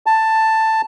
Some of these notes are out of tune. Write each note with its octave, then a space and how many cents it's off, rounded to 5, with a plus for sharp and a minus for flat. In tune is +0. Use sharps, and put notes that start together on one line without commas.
A5 +10